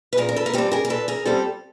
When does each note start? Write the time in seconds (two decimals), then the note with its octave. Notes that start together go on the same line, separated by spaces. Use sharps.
0.13 B4
0.17 A#2 G#4 A#4
0.29 A#4
0.36 A4 B4
0.46 A#4
0.53 G3 C4 G4 A4
0.72 G#4 A#4
0.85 A#4
0.90 A#2 A4 B4
1.08 G#4 A#4
1.26 G3 C4 G4 A4